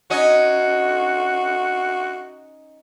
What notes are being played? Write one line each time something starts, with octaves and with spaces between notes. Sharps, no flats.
C#4 D#4 F#4 D#5